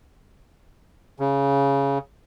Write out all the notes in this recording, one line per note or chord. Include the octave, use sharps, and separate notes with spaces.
C#3